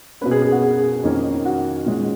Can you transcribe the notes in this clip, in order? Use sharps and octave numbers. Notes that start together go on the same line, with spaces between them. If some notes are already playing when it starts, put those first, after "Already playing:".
B2 A#3 C#4 B4
G#4
G#4
F#4
G#4
F2 D#3 A#3 C#4
F#4
A#2 G#3 C#4